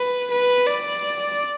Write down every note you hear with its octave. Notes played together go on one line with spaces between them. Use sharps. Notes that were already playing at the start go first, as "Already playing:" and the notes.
Already playing: B4
B4
D5